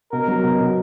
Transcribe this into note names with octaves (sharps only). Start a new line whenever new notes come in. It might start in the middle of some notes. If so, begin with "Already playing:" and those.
B2 A#4
F#3
B2
B2